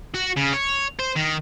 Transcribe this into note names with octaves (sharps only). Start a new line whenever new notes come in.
F#4
C#3
C#5
C5
D#3